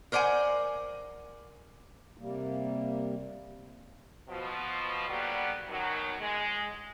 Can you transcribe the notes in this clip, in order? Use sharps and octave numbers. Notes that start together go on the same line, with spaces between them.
A#4 C5 D5 F#5 G#5
C3 G3 A#3
B2 F3
D3 F#3 G3 A#3 B3 G4
F#2 B2 D#3 F#3
G#3